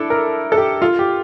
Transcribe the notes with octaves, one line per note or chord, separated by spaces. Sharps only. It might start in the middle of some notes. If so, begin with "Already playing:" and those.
Already playing: D4 E4 A4
A#4
A4
G4
F4
G4